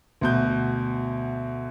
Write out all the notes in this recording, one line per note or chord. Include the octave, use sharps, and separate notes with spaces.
D2 B2 G6